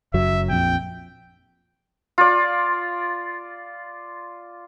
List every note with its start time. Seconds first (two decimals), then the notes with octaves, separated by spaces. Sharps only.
0.14 F#1 F#2 F#3 E5
0.50 A#1 F2 G5
2.18 F4 D5